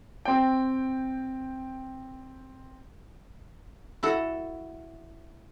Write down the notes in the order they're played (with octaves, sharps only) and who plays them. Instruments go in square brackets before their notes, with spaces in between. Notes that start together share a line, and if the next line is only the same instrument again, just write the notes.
[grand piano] C4 G5
[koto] E4 F#4 A4